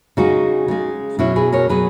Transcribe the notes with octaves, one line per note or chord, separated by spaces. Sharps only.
C#3 G#3 D#4 F#4
C#3 G#3
B2 F#3 C#4 E4
G#4 B4
A#4 C#5
B2 F#3 G#4 B4